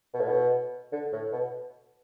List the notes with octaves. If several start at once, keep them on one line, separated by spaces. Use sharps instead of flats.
B2
A2
B2
D3
A2
B2